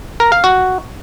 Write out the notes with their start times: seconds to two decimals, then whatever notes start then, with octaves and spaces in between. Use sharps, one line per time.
0.20 A#4
0.32 F5
0.44 F#4